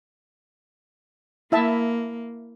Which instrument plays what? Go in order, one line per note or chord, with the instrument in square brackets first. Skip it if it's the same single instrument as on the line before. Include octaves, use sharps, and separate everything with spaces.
[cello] A#3 [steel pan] E4 E5 A5